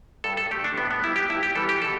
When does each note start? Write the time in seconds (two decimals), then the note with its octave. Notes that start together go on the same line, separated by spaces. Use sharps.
0.24 G2 A4
0.37 A4
0.51 D3 A3 G4
0.64 D4
0.77 A2 B3
0.91 B3
1.03 G3 B3 E4
1.16 G4
1.30 G2 E4
1.43 G4
1.55 E3 G3 B3 A4
1.69 G4
1.82 B2 A4